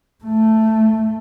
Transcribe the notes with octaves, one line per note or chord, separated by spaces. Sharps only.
A3